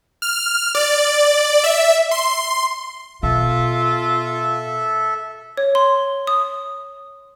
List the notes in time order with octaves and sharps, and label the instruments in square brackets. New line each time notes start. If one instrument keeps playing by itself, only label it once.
[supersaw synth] F6
D5
E5
C6
[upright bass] B2 [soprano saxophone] F4 [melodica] A4 E5
[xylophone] C#5
C6
D#6